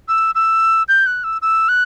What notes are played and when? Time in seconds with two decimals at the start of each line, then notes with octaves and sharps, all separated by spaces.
0.08 E6
0.35 E6
0.88 G6
1.06 F#6
1.24 E6
1.42 E6
1.69 F#6